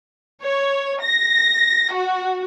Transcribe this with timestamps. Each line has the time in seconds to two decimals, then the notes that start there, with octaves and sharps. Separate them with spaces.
0.42 C#5
1.01 A#6
1.93 F#4